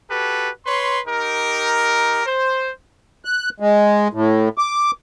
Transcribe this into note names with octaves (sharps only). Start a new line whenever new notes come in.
F#4 G4 A4 B4
B4 C#5 C6
D#4 G4 A#4
C5
F#6
G#3
A2
D6